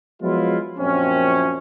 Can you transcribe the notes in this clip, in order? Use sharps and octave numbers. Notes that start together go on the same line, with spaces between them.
F3 F#3 G#3 B3 E4 F4
A#1 F#2 F3 C4 C#4